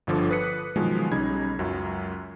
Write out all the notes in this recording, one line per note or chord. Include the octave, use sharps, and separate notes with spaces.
G1 D3 F3 A4 D6
B4 D#6 F#6 B6 C#7
B2 D#3 F3 F#3 G#3
B1 C#3 G3 D#4 B5 G#6
C#2 F#2 F#3